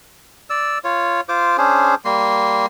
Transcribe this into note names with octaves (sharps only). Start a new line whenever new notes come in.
D5 E6
F4 C#5
F4 C5 D6
C#4 D4 G#4 C5
G3 A#3 C6